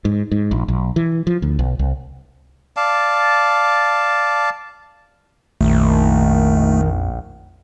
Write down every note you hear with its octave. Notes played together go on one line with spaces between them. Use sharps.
G#2
G#2
A#1
B1
E3
F3
D2
B1
C2
D5 F5 A5
A#1 F2 D#3 A3